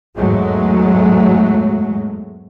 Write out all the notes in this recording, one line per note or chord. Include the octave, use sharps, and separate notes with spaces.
E2 G#2 F#3 G#3 A3